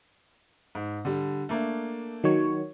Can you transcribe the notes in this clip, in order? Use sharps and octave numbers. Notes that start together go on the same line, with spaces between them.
G#2
D3 G3
A3 A#3 D4
D#3 F#3 C#5